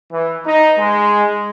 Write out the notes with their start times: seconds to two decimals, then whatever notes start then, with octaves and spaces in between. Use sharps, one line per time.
0.12 E3
0.46 D#4
0.79 G#3